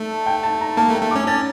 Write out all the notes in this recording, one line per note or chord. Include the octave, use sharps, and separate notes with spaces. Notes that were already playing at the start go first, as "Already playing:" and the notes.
Already playing: A3 A5
G5
A5
A#5
A#3 A5
A3
G5
A3
D6
C#4
C#4 A6